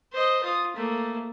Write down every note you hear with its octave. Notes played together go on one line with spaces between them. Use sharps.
C5 D#5
F4 D#6
A3 A#3